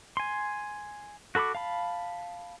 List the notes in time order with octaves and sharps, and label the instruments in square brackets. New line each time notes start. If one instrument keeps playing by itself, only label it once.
[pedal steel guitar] G#5 C6
F#4 A4 B5 C#6 D6
F5 A5 B5